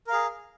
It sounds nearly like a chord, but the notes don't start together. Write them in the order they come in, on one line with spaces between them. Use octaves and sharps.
A#4 F5 G#4